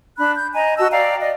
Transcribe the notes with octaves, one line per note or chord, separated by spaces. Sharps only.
D4 B5 F#6
G6
D#5 G#5 A#5
F#4 D#5 A5 E6
D5 F5 G5 A#5
D5 D#5